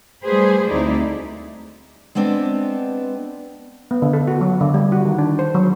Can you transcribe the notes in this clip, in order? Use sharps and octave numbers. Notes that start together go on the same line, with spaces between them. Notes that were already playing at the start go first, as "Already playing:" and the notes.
G3 A3 G#4 B4 C5
D2 C4 D#4 E4 D5
G#3 B3 C4 D4
B3
D3
A4
F#4
F#3
D3
G3
F#4
D#3
D4
C5
F#3